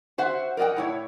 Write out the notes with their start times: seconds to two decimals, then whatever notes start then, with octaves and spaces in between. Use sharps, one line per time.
0.18 F#4 C5 E5 F#5
0.57 A#4 D5 D#5 F#5 G5
0.76 A2 E4 C#5